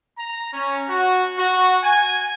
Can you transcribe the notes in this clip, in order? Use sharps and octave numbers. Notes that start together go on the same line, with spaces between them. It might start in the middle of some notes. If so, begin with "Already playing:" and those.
A#5
C#4
F#4
F#4
G#5